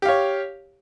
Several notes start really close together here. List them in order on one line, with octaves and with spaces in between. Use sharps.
G4 F5 C#5